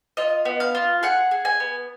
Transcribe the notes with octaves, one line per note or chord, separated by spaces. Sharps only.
F4 D#5
B3
F5
F4
G#4 F#5
G#4
G#5
B3